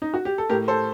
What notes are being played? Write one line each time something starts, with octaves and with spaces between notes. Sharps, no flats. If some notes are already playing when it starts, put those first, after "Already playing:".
D#4
F#4
G4
A4
A2 G4 A#4
A4 C5